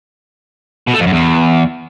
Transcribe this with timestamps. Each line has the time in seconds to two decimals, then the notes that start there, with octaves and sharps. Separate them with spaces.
0.87 B2
0.94 A3
1.00 F2
1.06 F#2
1.13 E2